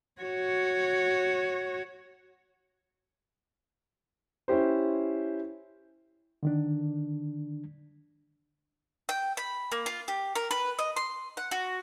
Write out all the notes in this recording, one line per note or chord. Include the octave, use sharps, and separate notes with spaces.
F#4 C#5
C#4 E4 G4 C5
D3 D#3 D4
G5
B5
A#3
F4
G4
A#4
B4
D#5
C6
F#5
F#4